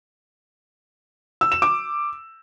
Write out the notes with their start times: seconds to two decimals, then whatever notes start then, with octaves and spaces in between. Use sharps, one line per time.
1.41 E6
1.52 E7
1.62 D6